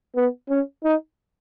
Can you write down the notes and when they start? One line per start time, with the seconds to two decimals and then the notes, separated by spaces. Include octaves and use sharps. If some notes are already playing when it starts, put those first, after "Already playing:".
0.16 B3
0.49 C#4
0.84 D#4